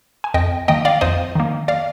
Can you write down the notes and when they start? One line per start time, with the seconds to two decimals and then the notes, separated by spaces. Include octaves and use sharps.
0.24 G#5
0.34 F2 D#5 G5
0.68 D#3 A#3 D#5 G5
0.85 D5 F5
1.01 F2 C5 D#5
1.35 D#3 A#3
1.68 D5 F5